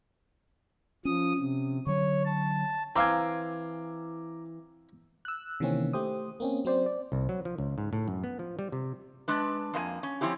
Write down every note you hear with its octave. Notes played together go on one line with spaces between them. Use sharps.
F3 C#4 D#6
C3
D3 F#3 C#5
A5
E3 C4 F5 G#5 A#5 D6 E6
E6 F#6
C3 D#3 E3 A#3 C4 C#4
A3 G4 C5 D#6
A#3 C4 C#4
F#3 C4 C5 D5
D5
C2
F#3
F3
C#2
G#2
A2
F#2
B3
F3
G3
C3
G#3 D4 B4
F2 A#3 E4 G#5
C#4
F3 C4 C#4 E4 G4